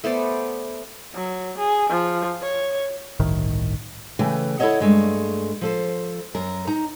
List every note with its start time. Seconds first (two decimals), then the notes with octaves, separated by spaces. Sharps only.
0.04 A3 B3 C5 D5
1.15 F#3
1.58 G#4
1.89 F3
2.42 C#5
3.19 G1 C2 A2 D#3
4.19 C#3 E3 A3 B4 G5
4.59 E4 A4 A#4 C#5 D#5 F#5
4.80 G2 G#3 A3
5.61 F3 A4 C5
6.35 F#2 A#4
6.67 D#4 A#5